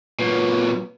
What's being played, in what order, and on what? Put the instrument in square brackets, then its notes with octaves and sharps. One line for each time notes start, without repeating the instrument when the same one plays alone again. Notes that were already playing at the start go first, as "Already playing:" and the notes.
[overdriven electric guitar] A#2 F#3 [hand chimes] B4